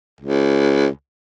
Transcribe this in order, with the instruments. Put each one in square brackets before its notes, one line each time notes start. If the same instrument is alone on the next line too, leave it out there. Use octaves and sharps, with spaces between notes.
[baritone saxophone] C#2